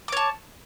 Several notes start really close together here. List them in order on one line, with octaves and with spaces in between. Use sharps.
D6 C#5 A5